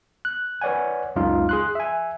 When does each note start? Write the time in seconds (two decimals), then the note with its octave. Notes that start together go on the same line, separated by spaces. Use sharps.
0.25 F#6
0.61 B4 C#5 D5 F#5 G#5
1.16 C#2 F#2 D#4 F4 F5
1.49 G#4 C6 F#6
1.75 E5 G#5